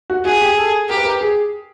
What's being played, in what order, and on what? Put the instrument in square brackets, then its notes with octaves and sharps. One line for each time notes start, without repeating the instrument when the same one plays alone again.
[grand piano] F#4
[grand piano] F#4 [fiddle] G#4
[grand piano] G4
A4
[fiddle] G4 [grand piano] A#4
[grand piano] B4
A#4
G#4